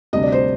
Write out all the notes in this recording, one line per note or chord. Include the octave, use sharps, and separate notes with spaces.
D2 C3 G3 D4 D#5
D5
C5